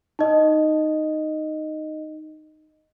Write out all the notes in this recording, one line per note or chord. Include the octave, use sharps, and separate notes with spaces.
D#4 D#5